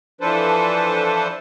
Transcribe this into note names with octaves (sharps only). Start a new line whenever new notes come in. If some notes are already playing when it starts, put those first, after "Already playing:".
E3 F3 D4 A4 B4 C5